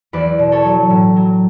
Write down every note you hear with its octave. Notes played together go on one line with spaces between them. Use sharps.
E2 B4 D5
B2
A4 C#5
F#3
A2
F#3